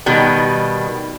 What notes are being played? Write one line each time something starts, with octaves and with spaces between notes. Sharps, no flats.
B2 D#3 G3